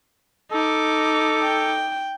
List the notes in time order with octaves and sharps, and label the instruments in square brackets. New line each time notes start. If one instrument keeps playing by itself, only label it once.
[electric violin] D#4 D6 [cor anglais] A4
[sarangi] G5